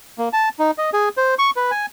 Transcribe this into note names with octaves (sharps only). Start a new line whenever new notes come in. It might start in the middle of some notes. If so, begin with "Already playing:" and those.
A#3
A5
D#4
D#5
G#4
C5
C#6
B4
G#5